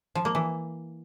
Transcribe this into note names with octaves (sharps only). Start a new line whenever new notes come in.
F3
A#3
E3